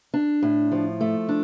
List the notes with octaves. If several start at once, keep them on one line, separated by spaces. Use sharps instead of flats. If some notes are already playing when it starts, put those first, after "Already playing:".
D4
A2
F3
A3
D4